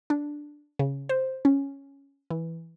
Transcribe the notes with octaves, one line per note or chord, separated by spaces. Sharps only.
D4
C#3
C5
C#4
E3